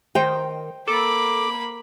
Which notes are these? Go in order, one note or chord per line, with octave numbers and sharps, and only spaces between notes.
D#3 C5 G5
A#3 A4 B5 D6